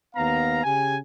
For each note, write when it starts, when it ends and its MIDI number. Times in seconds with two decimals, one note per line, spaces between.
0.15 0.62 39
0.15 0.62 59
0.15 0.62 77
0.15 0.62 82
0.63 0.96 49
0.63 0.96 67
0.63 0.96 80